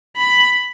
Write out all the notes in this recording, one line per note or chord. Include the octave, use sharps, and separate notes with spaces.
B5